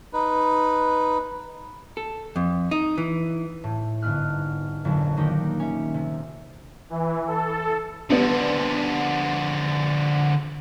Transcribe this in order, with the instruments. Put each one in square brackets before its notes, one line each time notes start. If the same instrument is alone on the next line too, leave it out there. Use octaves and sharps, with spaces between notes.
[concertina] D#4 B4
[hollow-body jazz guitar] A4
F2
D#4
E3
[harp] A2
G1 G#2 B3 F6 F#6
G1 F2 A#2 F#3
D#3 A#3 D#4 F#4 G4
C#4 E5
C3
[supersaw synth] E3
A4
[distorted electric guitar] D3 F3 [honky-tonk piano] G3 B3 D4